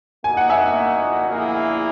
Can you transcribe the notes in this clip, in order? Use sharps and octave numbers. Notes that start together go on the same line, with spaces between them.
A#2 A#3 D#4 F#4 G#5
F#5
E5 G#5
A#1 A#2 A#3 E4 G#4